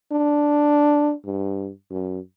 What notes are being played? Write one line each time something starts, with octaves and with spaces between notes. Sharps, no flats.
D4
G2
F#2